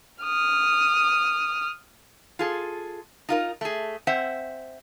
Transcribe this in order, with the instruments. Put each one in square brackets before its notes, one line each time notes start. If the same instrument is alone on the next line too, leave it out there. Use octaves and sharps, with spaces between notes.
[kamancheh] D#6 F6
[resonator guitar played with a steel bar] F4 G#4 A4
D#4 F4 A#4
A3 G#4
C4 C5 E5 F#5